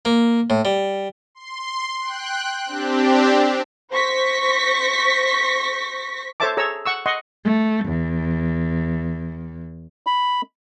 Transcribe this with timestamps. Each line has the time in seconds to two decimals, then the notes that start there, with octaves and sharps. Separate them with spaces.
0.05 A#3
0.50 A2
0.65 G3
1.35 C6
2.01 G5 F#6
2.66 C4 D4 G4
3.92 C5 C#6 A#6 B6
6.40 A4 C5 C#5 E5 A5 D6
6.57 G#4 A4 C#5 A#5 E6
6.85 F#5 C#6 E6
7.06 D#5 F#5 C6 C#6
7.44 A3
7.86 E2
10.07 B5